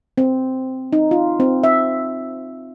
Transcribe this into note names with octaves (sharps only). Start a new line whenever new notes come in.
C4
D#4
F4
C4
E5